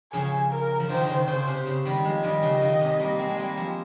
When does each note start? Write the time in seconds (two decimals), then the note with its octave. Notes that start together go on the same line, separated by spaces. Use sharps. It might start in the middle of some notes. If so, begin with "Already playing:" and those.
0.13 C#3 F3 G#4
0.52 A#4
0.80 F3
0.89 D#3 C5
1.01 D#3
1.09 C#3
1.28 C#3 C5
1.47 C3
1.66 C#3
1.85 D#3 G3
2.04 F3 G#3 D#5
2.23 D#3 G3
2.42 C#3 F3
2.61 D#3
2.81 C3
2.99 G3 A#3
3.19 G#3 C4
3.29 G#3
3.38 G3 A#3
3.57 F3 G#3